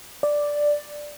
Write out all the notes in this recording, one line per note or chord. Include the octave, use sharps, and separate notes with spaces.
D5